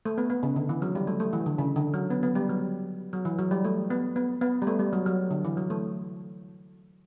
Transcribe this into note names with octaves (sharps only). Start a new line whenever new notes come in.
A3
B3
B3
C#3
D3
E3
F#3
G3
A3
A3
E3
D3
C#3
D3
F#3
B3
B3
G3
F#3
F#3
E3
F#3
G3
A3
B3
B3
B3
G3
A3
G3
F#3
F#3
D3
E3
F#3
A3